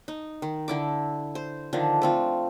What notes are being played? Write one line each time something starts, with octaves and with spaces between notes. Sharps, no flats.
D#4
D#3
D3 E4 D6
C5
D3 D#3 F3 D4
A3 C4 F4